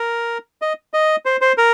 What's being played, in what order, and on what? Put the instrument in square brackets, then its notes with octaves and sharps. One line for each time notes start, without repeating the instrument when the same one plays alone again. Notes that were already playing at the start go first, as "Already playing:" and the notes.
Already playing: [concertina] A#4
D#5
D#5
C5
C5
A#4